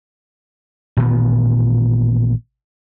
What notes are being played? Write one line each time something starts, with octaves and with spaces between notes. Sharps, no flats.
A1 A#2 D#3 B3